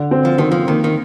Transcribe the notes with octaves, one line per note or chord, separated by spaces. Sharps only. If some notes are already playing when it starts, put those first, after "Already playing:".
Already playing: D3
C4
F3
D#3 C4
F3
D#3 A#3
D#3